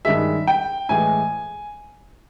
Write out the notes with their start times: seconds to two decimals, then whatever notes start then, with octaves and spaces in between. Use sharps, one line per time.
0.05 G2 D#3 G#3 E5
0.47 G5
0.89 A2 E3 G#3 G#5